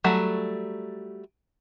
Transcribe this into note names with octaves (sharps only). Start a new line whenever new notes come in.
F#3 G3 A3